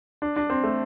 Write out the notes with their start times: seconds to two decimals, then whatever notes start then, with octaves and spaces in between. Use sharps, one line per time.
0.22 D4
0.36 D4
0.50 C4
0.64 A3